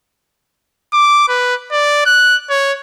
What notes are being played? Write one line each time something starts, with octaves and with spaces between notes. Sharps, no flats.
D6
B4
D5
F#6
C#5